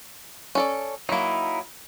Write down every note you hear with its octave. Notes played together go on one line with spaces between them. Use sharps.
C#4 A4 D5
F#3 A#3 D#4 E4